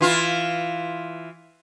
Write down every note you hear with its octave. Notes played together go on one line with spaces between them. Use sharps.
E3 F4